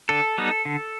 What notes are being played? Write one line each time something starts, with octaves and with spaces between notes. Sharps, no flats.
D3 A4
G3 B3 D#4
D3